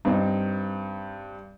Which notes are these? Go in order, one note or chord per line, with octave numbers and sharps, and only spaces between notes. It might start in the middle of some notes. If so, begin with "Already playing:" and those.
G2 C4 D#4